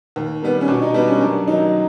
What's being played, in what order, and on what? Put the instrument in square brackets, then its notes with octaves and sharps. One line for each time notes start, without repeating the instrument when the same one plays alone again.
[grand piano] D#2
D#3 G3 B3
C#4
B2 D4
D#4
G3 B3 D4
C#4
F#2 D4
D#3 F#3 D#4